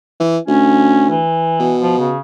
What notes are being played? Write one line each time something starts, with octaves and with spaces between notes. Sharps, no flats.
E3
D2 C#4
E3
B2
F3
C#3